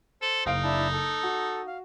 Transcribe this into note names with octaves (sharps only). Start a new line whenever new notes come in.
A4 C5
F#1 D#4 F5 D7
D4 E4 A5
A4
F#4
F5